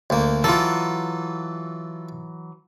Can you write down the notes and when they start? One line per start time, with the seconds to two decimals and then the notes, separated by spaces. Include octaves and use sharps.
0.10 D2 A#3
0.44 E3 F#3 F4 A4